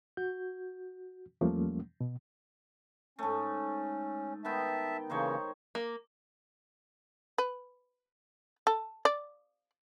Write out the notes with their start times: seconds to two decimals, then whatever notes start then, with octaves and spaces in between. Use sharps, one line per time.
0.17 F#4 G6
1.41 E2 F3 G3 A3 A#3 C#4
2.01 B2
3.19 G#2 A3 C#4
4.45 D#3 B3 E5 G5 A5
5.10 C#3 E3 A#3 D#4 C5 C#5
5.75 A#3
7.38 B4
8.67 A4
9.05 D5